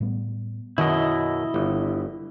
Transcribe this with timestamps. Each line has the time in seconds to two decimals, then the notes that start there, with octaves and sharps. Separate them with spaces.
0.01 A2 G3 B3
0.78 F#2 B2 D#3 E4 D#5
1.54 G1